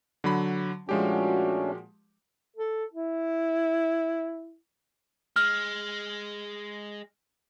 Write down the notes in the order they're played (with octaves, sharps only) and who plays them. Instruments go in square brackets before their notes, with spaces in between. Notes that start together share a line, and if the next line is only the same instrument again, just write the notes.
[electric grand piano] D3 F#3 B5
[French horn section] A#2 F#4 [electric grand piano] F3 G#3 G4 [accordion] A3 C#4 D4
[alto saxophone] A4
E4
[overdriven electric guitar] G#3 [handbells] F6